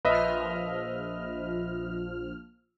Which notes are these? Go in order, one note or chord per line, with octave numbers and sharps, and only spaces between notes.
A#1 F3 B4 D#5 E5 F6